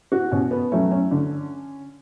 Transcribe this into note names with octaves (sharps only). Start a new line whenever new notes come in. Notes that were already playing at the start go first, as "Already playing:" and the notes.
F#4
B2 C#4
B3
F#3 A3 C#4
C#4
D3